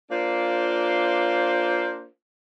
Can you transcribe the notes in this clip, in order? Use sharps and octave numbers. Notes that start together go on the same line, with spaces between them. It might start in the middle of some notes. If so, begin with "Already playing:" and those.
A#3 D4 F4 C5